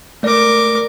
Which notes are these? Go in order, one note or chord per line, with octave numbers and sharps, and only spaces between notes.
A3 A#4 D5 D6